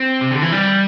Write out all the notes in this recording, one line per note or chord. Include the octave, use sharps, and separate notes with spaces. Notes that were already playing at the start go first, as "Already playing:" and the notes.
Already playing: C4
C3
D3
E3
G3